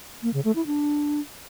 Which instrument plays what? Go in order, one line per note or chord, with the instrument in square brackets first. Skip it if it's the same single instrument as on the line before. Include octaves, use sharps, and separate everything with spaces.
[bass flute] A#3
C#3
A3
E4
D4